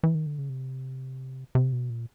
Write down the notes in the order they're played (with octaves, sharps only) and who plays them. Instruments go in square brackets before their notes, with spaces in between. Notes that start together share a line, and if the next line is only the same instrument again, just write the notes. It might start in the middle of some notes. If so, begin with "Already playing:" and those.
[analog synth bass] E3
D#3
D3
C#3
C3
C3
B2
A#2